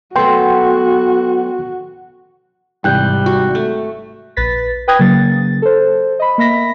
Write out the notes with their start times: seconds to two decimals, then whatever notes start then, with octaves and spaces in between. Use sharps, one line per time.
0.16 F#3 A3 B3 F#4 G5 C6
2.84 G#1 C3 E3 G3 G5 F#6 G6
3.26 F#4
3.55 A3
4.36 A#1 B4 A6 B6
4.87 B4 G5 D#6 F#6 G#6 A#6
4.99 C#3 F#3 A#3 A6
5.62 A4 C5
6.19 D#5 B5
6.38 A#3 E5 B5 A#6 B6